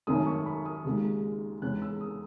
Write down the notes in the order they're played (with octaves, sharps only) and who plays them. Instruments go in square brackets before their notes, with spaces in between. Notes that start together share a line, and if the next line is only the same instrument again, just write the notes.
[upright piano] G#1 F#2 D#3 A3 C#4 D#6
C#6
B5
D#6
D#2 C#3 G#3
E2 C#3 G#3 C#4 F#6
E6
D#6